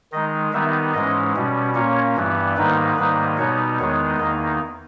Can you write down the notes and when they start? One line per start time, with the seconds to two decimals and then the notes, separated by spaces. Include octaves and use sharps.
0.12 D#3 G#3 D#4 D#5
0.53 D#3 G3 B3 D#4 E5
0.93 G#2 E3 G#3 C#4 D#5
1.35 B2 G3 C#4
1.75 A#2 A#3 C#4 C#5
2.16 G2 E3 G3 B3
2.56 G#2 D#3 G3 A#3 D#4 B4
2.97 G#2 D#3 G3 A#3 D#4 B4
3.38 B2 G3 B3 D#4 C#5
3.79 E2 D#3 G#3 B3 D#4 C#5
4.19 E2 D#3 A#3 D#4 D#5